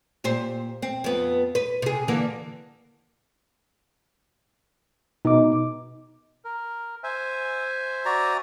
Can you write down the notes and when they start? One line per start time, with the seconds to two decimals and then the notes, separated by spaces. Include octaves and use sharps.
0.24 A#2 G4 C5
0.82 C4
1.04 F2 B3
1.55 B4
1.82 C3 G#4
2.08 D3 E3 A#3
5.25 B2 D#4 D6
6.45 A#4
7.04 C5 E5 G#5
8.05 F#4 D5 A#5